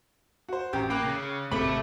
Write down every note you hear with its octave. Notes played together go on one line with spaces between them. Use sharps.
F#4 C5
A1 C#4 G4 A#5
A#3 G5 B5 D6 F#6
C#3
G#1 C3 A3 B5 D6